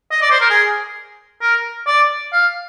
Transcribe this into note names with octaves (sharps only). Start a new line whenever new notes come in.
D#5
D5
C5
A#4
G#4
A#4
D5
F5